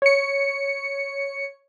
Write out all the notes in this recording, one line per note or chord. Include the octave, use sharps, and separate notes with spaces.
C#5 C#7